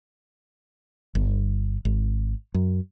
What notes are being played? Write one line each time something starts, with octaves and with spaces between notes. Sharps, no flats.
G1
G#1
F#2